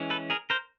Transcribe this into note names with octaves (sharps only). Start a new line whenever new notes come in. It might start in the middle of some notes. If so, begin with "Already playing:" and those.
Already playing: E3 G#3 C#4
A4 B4
G#4 A#4
A#4 C5